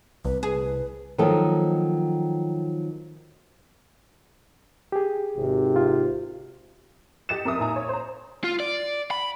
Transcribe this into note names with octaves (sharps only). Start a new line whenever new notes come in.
C2 B4
G#4 B4
D#3 F3 F#3 A#3 A4 D#5
G4 G#4
G#1 C3
F4
G4 D#5 A6 C#7 E7
F2 A#4 E5 D#6
A#2 D#4 E5 G#5 A#5
C#5
C5 A#5
F4
D5
B5